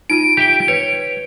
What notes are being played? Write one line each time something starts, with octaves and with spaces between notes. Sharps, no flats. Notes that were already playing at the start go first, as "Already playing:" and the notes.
D#4 F4 D7 D#7
G4 E5 G5
B4 C#5